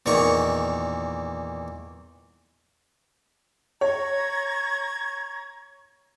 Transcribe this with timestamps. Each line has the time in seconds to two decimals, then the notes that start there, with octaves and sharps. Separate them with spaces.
0.06 E2 A#2 D#3 A#5 C#6
3.81 C#5 A#5 C#6 G#6